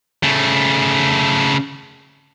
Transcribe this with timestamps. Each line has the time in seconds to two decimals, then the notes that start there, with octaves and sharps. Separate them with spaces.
0.23 C#3 A3